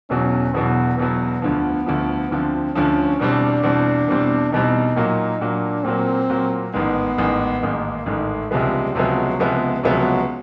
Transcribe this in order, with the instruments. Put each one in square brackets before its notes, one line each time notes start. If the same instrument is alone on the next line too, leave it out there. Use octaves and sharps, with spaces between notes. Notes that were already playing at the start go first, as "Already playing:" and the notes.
[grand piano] E1 E2 B2 F#3 [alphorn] C#4
[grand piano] E1 E2 B2 F#3 [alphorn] B3
[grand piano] E1 E2 B2 F#3 [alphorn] B3
[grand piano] D2 D3 F3 [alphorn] B3
[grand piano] D2 D3 F3
[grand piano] D2 D3 F3 [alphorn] C4
[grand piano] D2 D3 F3 [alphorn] C#4
[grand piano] E2 B2 G3 C4 [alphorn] D4
[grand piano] E2 B2 G3 C4
E2 B2 G3 C4
[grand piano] E2 B2 G3 C4 [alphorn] D#4
[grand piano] A#2 F#3 A#3
[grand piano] A#2 F#3 A#3 [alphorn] D4
[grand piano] A#2 F#3 A#3 [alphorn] C4
[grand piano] A#2 F#3 A#3
[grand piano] A1 G#2 D#3 G#3 [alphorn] B3
[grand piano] A1 G#2 D#3 G#3
[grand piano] A1 G#2 D#3 G#3 [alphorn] A#3
[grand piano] A1 G#2 D#3 G#3 [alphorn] A3
[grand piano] C#2 C3 F3 G#3 B3 [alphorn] G3
[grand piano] C#2 C3 F3 G#3 B3 [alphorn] F#3
[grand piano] C#2 C3 F3 G#3 B3
[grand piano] C#2 C3 F3 G#3 B3 [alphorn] F#3